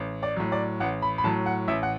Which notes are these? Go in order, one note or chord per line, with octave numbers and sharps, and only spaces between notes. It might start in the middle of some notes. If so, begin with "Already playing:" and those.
Already playing: A1
D5
A2 F#3
D5
A1 F#5
B5
B5
A2 F#3 A5
F#5
A1 E5
F#5